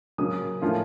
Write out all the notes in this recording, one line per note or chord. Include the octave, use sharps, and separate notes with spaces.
C#3 F#3 A#3 C#4 D#6
A2 F3 A#3 C#4 F4